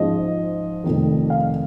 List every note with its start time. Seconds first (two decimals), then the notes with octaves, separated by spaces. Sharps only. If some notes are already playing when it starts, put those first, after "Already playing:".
Already playing: G#2 F3 G#3 C#4 D#5
0.84 F1 F2 D#3
1.30 F5